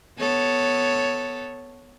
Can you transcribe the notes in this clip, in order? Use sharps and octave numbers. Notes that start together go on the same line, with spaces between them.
B3 A4 C#5